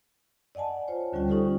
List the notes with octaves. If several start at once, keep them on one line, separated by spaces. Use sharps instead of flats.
D5 D#5 F#5 G#5 A5
F4 C5 C#5
D2 D3 G3 C#4 F4 G5
C#4 D#4 F4 G4 A4 C5